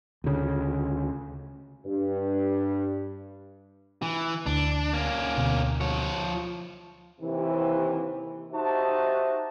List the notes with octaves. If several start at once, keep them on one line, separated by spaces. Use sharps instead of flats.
D2 C#3
G2
E3
D2 D4
A#3 C#4
D2 B2
F3 C#5
D#2 C3 E3
D#4 F#4 G4 C5 E5 A5